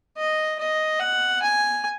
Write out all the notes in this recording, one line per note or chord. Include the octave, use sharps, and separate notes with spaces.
D#5
D#5
F#5
G#5